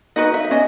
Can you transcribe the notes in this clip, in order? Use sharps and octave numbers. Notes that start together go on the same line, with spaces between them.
D#4 F#4 B4 D#5
E5
E5
C#4 D#5